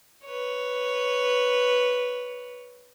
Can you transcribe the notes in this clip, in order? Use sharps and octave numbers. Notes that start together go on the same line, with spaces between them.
B4 C#5